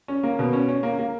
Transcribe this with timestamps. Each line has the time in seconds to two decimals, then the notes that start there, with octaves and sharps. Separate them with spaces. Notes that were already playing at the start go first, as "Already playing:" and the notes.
0.08 C#4
0.23 A#3
0.39 B2
0.53 C#4
0.68 C#4
0.83 A#3
0.99 A#3